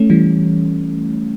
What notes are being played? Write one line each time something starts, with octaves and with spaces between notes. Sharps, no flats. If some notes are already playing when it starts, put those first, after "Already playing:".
Already playing: A3 C#4
E3 G3